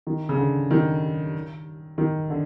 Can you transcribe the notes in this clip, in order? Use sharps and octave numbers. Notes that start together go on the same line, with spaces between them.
D#3
C#3
D3
D#3
D#3
D3